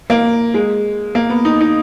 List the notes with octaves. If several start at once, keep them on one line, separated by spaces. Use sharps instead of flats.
A#3
G#3
A#3
B3
D#4
D#4